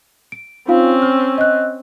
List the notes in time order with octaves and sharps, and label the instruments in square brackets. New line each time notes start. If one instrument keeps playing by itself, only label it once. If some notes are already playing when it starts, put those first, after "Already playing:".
[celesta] D7
[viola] C4 C#4 [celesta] D#4 F4 F5
[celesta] F6
D#5 F#6